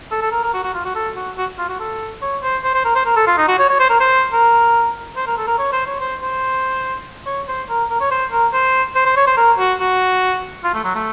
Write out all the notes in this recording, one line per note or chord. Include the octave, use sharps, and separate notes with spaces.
A4
A4
A#4
A#4
F#4
F#4
F4
F#4
A4
F#4
F#4
F4
F#4
A4
C#5
C5
C5
C5
A#4
C5
A#4
A4
F4
D#4
F#4
C#5
C#5
C5
A#4
C5
A#4
C5
A#4
A4
A#4
C#5
C5
C#5
C5
C5
C#5
C5
A#4
A#4
C#5
C5
A#4
C5
C5
C5
C#5
C5
A#4
F#4
F#4
F4
A3
F#3
A3